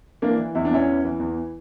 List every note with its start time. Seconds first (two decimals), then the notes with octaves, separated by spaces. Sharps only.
0.22 E3 A#3 D4
0.39 E3
0.55 E2 E4
0.65 D4
0.71 E2 C#4 E4
0.87 E3
1.04 E3
1.20 E2